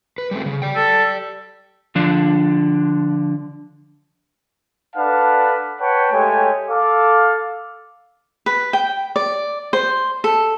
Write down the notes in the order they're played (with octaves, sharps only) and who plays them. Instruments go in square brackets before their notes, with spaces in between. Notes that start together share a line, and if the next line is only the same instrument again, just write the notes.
[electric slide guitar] B4
G3 A3 C4
C#3
D5 G5
[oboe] A4
[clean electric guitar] D3 F3 D4
[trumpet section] D4 A4 B4 F5 F#5 A5
B4 C#5 F#5 G5 A5
G#3 A3 G4 C#5 G5 G#5
A4 F5 D6
[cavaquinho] B4
G5
D5
C5
A4